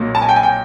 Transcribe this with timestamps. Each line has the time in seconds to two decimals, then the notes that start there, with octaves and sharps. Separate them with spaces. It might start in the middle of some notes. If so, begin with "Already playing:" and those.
Already playing: B1 A#2 F#3 A#3
0.15 A5
0.22 G#5
0.29 G5
0.36 G#5
0.43 G5